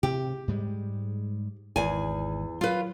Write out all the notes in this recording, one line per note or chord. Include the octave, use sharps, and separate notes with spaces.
C3 G4
G#2 G3 G#3
G#1 E2 G#5
F#3 F4 B4